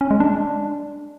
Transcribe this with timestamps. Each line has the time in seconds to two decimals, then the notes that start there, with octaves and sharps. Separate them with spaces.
0.01 C#4
0.11 G#3
0.20 D4